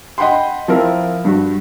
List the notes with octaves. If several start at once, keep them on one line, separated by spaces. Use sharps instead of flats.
D#5 F#5 G5 B5 C6
F3 C4 E4 A#4
G2 F#4